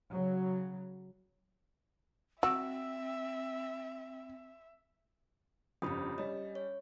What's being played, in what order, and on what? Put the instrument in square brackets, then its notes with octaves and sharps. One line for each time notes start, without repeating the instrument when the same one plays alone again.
[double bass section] C#3 F#3
[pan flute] C4 [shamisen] F#4 [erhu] E5 [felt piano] E6
[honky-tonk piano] G1 F2 C#3 [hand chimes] G4 B5 D#6
[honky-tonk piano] G3 C#4 [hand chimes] D#5
[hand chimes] C#5